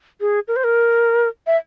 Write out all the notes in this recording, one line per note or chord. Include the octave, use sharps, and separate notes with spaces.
G#4
A#4
C5
A#4
E5